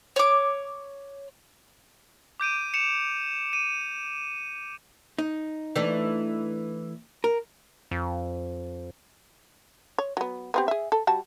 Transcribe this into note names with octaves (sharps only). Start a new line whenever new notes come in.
C#5 D6
D6 G6 D7 D#7
C#7 E7 F7
D#7
D#4
E3 A3 D4
A#4
F2
C#5
F#3 B3
B3 C4 G4
G#4 E5
A4
G3 F#4 A5